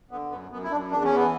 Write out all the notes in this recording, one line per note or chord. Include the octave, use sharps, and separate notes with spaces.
D3 B3
F#2 B3
F#2 B3
E4
F#2 D4
E2 D4
C#4
E3 B3